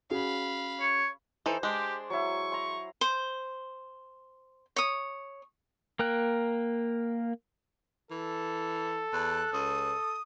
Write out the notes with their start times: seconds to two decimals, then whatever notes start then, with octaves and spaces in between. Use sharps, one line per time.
0.11 C#4 F#4 G#4 F5 B5
0.80 C#5
1.46 E3 D#4 A4 C5
1.63 G#3 D4 G4 C6
2.10 F#3 E4 C#6
2.52 A#5 C6
3.01 C5
4.76 C#5 D#6
5.99 A#3 A#4 G5 F#6
8.11 E3 A4
9.13 E2 F#6
9.53 C#2 D#6